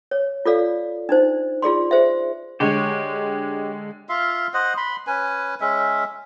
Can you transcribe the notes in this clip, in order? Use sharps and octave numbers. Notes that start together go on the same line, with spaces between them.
C#5
F4 A4 D5 F5
D4 D#4 C5
F4 G#4 D5 C6
G#4 C5 E5
D3 G#3 G4 C#5
F4 E5 F5 C6
C5 D#5 F#5
B5 C6
C#4 B4 G#5
G#3 C#4 E5